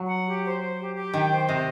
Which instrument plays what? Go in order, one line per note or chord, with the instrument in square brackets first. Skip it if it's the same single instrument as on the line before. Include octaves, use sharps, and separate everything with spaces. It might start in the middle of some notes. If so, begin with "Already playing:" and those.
Already playing: [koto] F#3
[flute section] F#5
G4
C5
C5
G4
G4
[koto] D#3 [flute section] G5
[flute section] C5
[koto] C3 [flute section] D#5